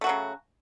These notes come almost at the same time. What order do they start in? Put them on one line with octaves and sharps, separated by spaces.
A3 F#4 F#3 C#3